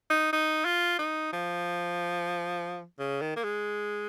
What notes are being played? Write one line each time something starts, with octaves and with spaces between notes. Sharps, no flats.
D#4
D#4
F4
D#4
F3
C#3
D#3
A#3
G#3